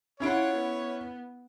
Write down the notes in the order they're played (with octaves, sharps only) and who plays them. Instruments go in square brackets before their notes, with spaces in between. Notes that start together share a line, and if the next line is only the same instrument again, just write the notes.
[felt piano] C#4 E4 D7 [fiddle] F4 F#5 [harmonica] C#5
[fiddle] B3